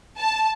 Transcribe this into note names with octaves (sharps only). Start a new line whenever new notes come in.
A5